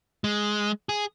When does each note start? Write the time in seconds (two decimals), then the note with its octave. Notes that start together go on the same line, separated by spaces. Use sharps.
0.24 G#3
0.89 G#4